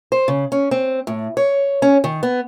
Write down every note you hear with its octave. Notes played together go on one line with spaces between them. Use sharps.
C5
C#3
C#4
C4
A2
C#5
C#4
D#3
B3